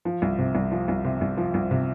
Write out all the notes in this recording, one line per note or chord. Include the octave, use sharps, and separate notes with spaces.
F3
C2
C3
C2
F3
C2
C3
C2
F3
C2
C3